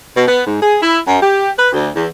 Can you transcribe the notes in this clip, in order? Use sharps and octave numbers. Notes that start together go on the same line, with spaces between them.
B2
B3
G#2
G#4
E4
F#2
G4
B4
D2
E2